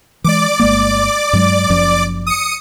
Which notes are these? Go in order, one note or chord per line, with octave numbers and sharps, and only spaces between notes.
E3 G#3 D5 D6
G1 G#3 A#3
G2 F#3 G#3
F#1 F#2 F3
D#6 C#7